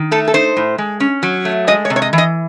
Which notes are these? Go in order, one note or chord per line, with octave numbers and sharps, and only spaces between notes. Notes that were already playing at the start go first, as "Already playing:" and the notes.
Already playing: D#3
A3 A4
A4
D#4 C5
A2
G#3
C#4
F#3
A3
G#3 D#5
C#5
C3
C#5
D#5
E3
D#5